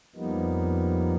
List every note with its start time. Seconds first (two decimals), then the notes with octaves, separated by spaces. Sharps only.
0.16 F2 F3 G3 A#3 B3 D#4